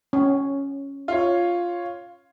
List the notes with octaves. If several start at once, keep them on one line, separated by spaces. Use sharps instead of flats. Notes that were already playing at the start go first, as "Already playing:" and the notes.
C#4
F4 C#5